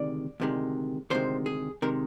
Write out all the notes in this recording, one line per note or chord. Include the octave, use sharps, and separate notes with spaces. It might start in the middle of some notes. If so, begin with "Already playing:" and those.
Already playing: D2 C3 D#3 G#3 D5
D2 C3 D#3 G#3
D2 C3 D#3 G#3 C5
G#4
C3 D#3 G#3 A#4